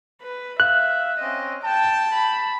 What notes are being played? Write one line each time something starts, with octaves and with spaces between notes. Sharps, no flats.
B4
E5 F5 F#6
C4 C#4 D#5
G5 A5
B5